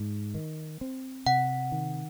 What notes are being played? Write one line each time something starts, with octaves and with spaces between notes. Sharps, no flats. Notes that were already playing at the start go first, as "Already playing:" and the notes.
Already playing: G#2
D#3
C4
C3 F#5
D#3